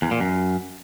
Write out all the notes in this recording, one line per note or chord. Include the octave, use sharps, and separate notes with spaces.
E2
A#2
F#2